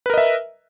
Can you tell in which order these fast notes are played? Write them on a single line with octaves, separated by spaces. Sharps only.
B4 A#4 D#5 E5